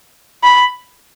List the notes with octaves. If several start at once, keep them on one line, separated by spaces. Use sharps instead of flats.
B5